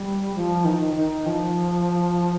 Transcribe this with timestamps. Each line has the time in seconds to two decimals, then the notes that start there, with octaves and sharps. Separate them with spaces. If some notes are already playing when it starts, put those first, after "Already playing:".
Already playing: G3
0.35 F3
0.65 D#3
0.95 D#3
1.26 F3